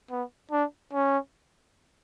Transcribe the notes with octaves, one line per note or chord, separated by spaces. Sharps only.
B3
D4
C#4